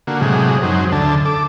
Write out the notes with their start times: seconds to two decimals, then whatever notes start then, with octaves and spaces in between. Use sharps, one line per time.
0.07 D3 A#3 F#4
0.21 A2 C3 F#3 G#3
0.63 F#2 F#3 D#4 C5
0.92 D2 D3 A5
1.25 A4 D6